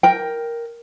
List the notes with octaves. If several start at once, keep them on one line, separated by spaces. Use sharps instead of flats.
A#4 G5